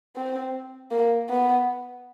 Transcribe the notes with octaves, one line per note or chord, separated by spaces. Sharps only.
C4
A#3
B3